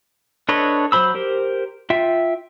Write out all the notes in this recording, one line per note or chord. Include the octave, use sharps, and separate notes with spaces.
D4 A4 B4 C#5 D#5
F#3 G#4 C5 B5 E6
G4 A#4 C5
F4 E5 G5